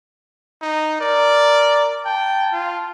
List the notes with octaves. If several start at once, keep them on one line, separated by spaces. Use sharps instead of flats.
D#4
A#4 D5
G5 A5
F4